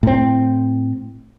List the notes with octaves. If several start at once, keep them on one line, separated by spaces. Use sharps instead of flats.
A2 C4